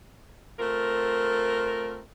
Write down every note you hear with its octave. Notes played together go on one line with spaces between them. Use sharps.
A3 C4 F4 A#4